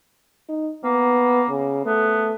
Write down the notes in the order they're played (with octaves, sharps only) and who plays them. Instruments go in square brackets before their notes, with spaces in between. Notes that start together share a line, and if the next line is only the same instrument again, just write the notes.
[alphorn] D#4
[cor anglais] A#3 [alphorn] B3
[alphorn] C#3
[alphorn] A3 [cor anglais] B3